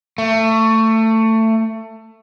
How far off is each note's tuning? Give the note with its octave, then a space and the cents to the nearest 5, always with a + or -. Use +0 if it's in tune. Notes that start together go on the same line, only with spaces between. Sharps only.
A3 +20